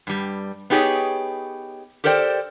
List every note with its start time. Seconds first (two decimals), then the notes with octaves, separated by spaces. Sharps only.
0.07 G2 G3
0.70 B3 D#4 G4 G#4 C#5
2.04 G4 A4 A#4 C5 D5 G5